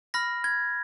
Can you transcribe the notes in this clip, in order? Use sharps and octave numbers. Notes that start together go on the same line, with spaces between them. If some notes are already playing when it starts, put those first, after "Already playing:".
B5 F6 A#6
G#6